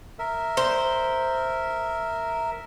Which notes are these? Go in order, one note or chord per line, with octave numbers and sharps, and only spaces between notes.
A#4 E5
C5